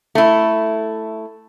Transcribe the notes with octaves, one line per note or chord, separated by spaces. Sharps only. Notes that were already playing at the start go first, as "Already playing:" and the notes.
A3 E4